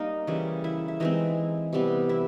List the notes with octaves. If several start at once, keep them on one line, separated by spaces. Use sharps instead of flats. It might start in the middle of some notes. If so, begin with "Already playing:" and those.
Already playing: G3 A#3 D#4 A#4 D#5
C#3 E3 G3
E4 E5
E5
E3 G#3 C4 D#4 D#5
C3 E3 G3 B3
E4 E5